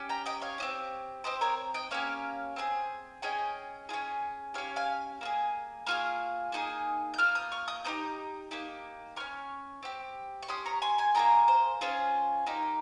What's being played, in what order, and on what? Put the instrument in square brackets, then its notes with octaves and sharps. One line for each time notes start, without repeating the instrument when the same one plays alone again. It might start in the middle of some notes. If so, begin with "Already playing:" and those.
Already playing: [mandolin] C#4 G4
G5 A#5
D#5 G5
C#5 F5
C4 D#4 G4
C4 G4 C5 D#5
A#4 C#5
D#5 G5
A#3 C#4 G4 C#5 F5
C4 F4 G#4
C#4 G#4 D#5 G5
F4 G#4
C#4
C#4 G4 C#5 F5
F5 G#5
A#3 F4
G#4
A#3 F4 G#4 C#6 F6
A#3 D#4 G#4
G6
A#3 F4 F6
D#6 G6
C#6 F6
D#6 G6
C4 D#4 G4 D#6 G6
A#3 D#4 G4
C#4 G4 C#6 F6
C4 G4
C#6
C#4 G4 C6 D#6
A#5 C#6
G#5 C6
G#5 C6
A#3 F4 G#4 G5 A#5
C5
C#4 F4 G#4 C5
A#3 D#4 G4